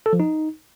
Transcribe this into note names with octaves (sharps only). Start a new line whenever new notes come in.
A4
F3
D#4